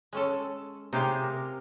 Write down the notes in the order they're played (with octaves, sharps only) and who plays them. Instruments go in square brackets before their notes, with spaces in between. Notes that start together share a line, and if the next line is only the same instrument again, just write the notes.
[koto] G#3 C#4 A4
[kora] C3 C4 G#4 [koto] D#4 G4 F5
[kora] A#4